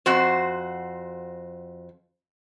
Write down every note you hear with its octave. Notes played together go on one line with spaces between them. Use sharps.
F2 F#4 C5